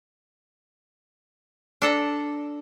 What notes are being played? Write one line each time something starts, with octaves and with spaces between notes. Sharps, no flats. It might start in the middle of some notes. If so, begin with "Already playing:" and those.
D4 A4 A#5